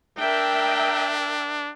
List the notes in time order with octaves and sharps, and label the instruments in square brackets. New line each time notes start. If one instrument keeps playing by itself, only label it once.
[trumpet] D4 [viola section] A#4 E5 G5